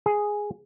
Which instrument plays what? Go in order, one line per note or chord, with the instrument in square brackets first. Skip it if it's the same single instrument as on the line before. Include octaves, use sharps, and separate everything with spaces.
[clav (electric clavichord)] G#4